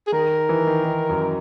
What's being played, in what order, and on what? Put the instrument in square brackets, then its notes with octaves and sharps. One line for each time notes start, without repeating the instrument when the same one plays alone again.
[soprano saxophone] G#4
[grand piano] D#3 [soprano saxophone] A#4
[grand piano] E3
D#3
D#3
F#2